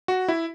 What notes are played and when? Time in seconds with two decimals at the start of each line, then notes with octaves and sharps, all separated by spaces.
0.08 F#4
0.28 E4